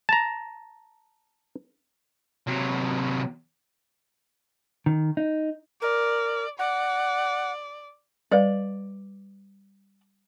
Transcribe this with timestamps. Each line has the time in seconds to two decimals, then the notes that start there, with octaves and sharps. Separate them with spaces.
0.09 A5 A#5
2.47 C3 F#3
4.86 D#3
5.17 D#4
5.82 A#4 D5
6.59 D5 F#5
8.31 G3 B4 D5 F5